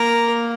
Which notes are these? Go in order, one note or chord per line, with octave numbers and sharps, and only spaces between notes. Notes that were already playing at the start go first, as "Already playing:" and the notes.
Already playing: A#3 A#4